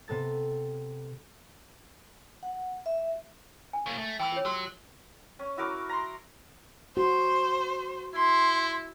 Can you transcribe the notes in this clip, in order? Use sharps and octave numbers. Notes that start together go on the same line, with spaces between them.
C3 B3 A4 A6
F#5
E5
G#5
C#3 A#3
A3
E3 G5 B5 E6
F4 C#5
F#3 G4 C6 E6
C#4
E4 F#4 A#4 D6
A#5 C6
F#4 C5
E4 C6